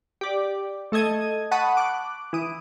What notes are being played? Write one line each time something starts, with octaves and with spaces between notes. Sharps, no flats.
G4 D5
A3 A4 D#5 G#6 D#7
F#5 A5 B5 C#6 D#6
D6 F#6
E3 D#6 D7